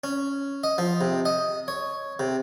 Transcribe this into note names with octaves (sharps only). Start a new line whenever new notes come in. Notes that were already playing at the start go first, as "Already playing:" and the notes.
C#4
D#5
F3
C3
D#5
C#5
C3